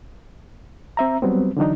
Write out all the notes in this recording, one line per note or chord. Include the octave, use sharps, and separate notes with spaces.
C4 E5 A#5
F#3 G3 B3 C4
D3 E3 F#3 D4 D#4